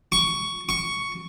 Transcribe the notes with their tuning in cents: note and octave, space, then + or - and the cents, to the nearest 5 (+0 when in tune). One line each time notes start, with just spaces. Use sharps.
C#6 +10
C#6 +5